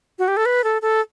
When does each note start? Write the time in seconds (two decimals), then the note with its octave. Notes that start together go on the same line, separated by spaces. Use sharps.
0.19 F#4
0.28 G4
0.37 A4
0.46 B4
0.64 A4
0.82 A4